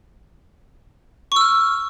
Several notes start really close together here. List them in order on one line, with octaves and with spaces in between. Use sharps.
C#6 E6 F6